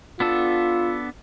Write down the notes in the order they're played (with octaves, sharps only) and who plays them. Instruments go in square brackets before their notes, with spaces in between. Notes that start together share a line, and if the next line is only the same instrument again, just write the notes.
[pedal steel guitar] B3 D4 A4 [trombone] F4